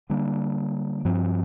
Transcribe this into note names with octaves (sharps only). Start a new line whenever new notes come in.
D3 G3 A#3 D4
G2 F3 C4